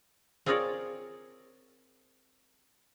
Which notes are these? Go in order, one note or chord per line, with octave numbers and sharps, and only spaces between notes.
C4 F4 G#4 A#4 C#5 D5